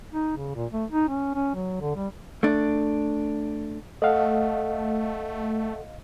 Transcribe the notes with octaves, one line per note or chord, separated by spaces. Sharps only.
D#4
C#3
A#2
A3
D#4
C#4
C#4
F#3
D3
G3
A3 D4
A3 A4 D#5 F5 F#5